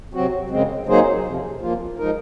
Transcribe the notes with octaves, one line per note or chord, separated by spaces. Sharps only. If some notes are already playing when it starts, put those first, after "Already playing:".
C3 F#3 C4 F#4
F#2 C#3 G#3 C4
F#3 A#3 D#4 G#4 C5
F2 C3 F3
F3 A#3 F4
F3 G#3 D#4 A#4